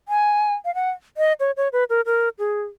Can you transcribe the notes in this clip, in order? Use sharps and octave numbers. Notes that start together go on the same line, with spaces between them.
G#5
F5
F#5
D#5
C#5
C#5
B4
A#4
A#4
G#4